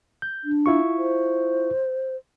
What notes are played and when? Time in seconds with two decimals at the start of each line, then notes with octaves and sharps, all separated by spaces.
0.22 G6
0.44 D4
0.66 E4 F4 C#6
0.98 C5